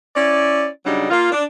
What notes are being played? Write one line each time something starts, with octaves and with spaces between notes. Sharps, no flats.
C#4 E4 D5
C#3 F#3 G3 D4 D#4
A#3 F4
D4